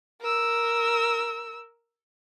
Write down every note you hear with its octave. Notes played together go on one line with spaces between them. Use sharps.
A#4 E6